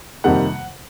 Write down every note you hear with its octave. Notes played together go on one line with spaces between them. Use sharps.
F2 C3 D#3 G3 A#3 F#5